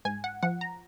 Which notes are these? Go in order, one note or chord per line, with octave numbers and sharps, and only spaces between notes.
G#2 G#5
F#5
F3 F#5
A#5